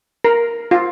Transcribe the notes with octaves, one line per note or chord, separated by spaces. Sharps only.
A#4
F4